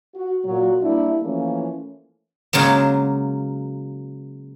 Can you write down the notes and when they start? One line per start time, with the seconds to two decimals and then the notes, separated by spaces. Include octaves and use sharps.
0.16 F#4
0.45 A#2 F#3
0.83 G3 A#3 D4 E4
1.23 E3 F3 A3 A#3 C#4
2.53 C#3 F#3 G#3 A#3